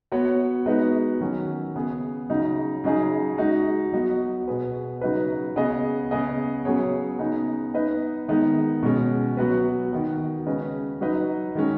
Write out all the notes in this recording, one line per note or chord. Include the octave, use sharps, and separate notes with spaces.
B3 F#4 C#5
G#3 B3 D#4 F#4 B4
D#3 F#3 C#4
C#3 B3 G#4
C#3 F#3 D#4
C#3 F#3 D#4 G#4
G#3 D#4 F#4
F#3 B3 F#4 D#5
B2 B3 G#4 B4
C#3 F#3 D#4 B4
C#3 B3 G#4 D#5
C#3 B3 G#4 D#5
C#3 F#3 B3 G#4 C#5
C#3 B3 D#4 G#4
B3 D#4 B4 D#5
D#3 G#3 B3 D#4
B2 G#3 C#4
F#3 B3 F#4 B4
D#3 B3 F#4
C#3 G#3 C#4 B4 D#5
F#3 D#4 B4 D#5
D#3 G#3 C#4